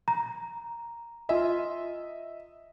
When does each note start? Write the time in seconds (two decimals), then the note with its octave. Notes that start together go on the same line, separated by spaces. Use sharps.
0.08 A#5
1.29 F4 D#5 E5 G#5